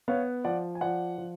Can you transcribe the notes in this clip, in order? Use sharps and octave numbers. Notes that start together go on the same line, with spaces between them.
B3 C#5 F5
F3 D5 F#5
G#5
F3 D5 F#5
F3